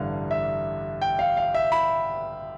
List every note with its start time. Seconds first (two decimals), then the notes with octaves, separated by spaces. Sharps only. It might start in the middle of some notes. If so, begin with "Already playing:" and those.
Already playing: A1 G2 D3 F5
0.31 E5
1.02 G5
1.19 F5
1.37 F5
1.55 E5
1.72 B5